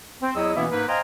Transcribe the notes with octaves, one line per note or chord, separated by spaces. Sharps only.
C4
E2 F#3 E4 D#5 D#6 E6
B2 E3 A#3 B3 C#4 E4
G#2 A#3 D#4 B4
C5 D#5 F5 G5 G#5 A#5